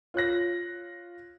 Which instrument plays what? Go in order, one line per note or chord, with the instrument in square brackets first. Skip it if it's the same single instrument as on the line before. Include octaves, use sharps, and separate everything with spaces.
[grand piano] F4 C#5 F#6 A#6